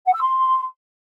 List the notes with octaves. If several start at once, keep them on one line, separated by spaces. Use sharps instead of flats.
F#5
E6
C6